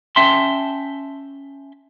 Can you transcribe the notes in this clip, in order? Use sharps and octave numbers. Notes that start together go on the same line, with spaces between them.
C#4 E5 G5 A5 C6